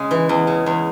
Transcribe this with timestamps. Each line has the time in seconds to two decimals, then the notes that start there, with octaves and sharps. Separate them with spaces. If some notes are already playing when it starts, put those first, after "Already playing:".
Already playing: C#3 G#3
0.11 E3
0.29 E2
0.47 C#3
0.66 E2